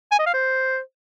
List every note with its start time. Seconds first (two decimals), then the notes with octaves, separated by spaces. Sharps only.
0.12 G#5
0.19 D#5
0.26 F5
0.34 C5